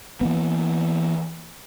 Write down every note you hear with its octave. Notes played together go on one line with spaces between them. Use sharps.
E3 A#3 B3